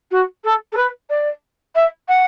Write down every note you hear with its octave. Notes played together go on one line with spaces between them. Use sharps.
F#4
A4
A4
B4
D5
E5
F#5